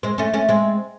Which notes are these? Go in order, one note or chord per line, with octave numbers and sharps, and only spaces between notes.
G#3 C4
A3 C#4
A3 C#4
G#3 C4